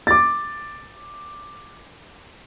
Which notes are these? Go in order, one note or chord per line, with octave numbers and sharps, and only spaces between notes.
D6 A6